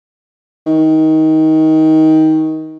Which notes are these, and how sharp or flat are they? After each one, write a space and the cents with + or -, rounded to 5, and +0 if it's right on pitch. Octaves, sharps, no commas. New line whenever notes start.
D#3 +20